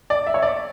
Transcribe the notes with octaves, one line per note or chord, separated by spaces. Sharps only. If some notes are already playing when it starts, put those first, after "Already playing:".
D5
E5
C#5
D5